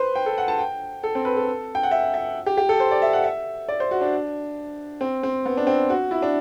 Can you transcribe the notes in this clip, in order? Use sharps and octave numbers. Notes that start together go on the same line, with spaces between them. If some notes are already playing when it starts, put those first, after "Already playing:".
Already playing: B4 C5
G5
A4
F#5
A5
G5
A4
C4
B4
A4
G5
F#5
E5
E5
G4
G4
A4
C5
D5
E5
F#5
E5
D5
C5
F#4
D4
C4
C4
B3
D4
C4
F#4
E4
D4